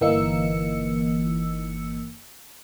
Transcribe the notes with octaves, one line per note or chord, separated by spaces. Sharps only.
G1 E3 A#3 D#4 E6 C#7